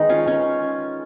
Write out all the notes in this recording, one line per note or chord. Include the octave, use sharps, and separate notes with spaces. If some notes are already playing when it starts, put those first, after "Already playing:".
Already playing: D#3 G#3 B3 D#4
C#4 F4
C#4